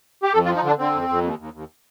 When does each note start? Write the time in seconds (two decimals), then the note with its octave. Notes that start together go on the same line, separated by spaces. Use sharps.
0.23 G4
0.33 F2 A4
0.45 F4
0.48 F3
0.56 D#4
0.63 D3 D4
0.78 D3 C4
0.94 F2
1.09 F2
1.23 D#2
1.39 D#2
1.54 D#2